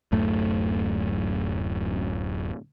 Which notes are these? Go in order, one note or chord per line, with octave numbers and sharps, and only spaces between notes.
D1 F#2 A3